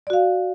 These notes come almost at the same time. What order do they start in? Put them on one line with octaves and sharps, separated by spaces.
D5 F#4 F5